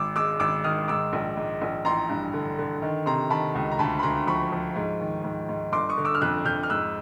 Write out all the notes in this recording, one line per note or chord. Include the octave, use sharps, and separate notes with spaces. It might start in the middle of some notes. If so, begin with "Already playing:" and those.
Already playing: G#1 D6 E6
G#3 D6 E6
G#1 D6 E6
D#3 D#6 F6
G#2 D6 E6
A#1
G#2
A#1
A1 A#5 C6
G2
D3
D3
D#3
C3 A#5 C6
D#3 A5 B5
C#2
A#5
D2 A5 B5
B5
D2 A#5 C6
F3 B5 C#6
F3
G#2
D#3
G#2
G#2
G1 C6 D6
C#6 D#6
D3
D6 E6
F6
F2 E6 F#6
F2 F6 G6
F6
G#2 E6 F#6